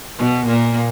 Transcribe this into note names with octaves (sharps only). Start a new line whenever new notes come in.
B2 B3
A#2 A#3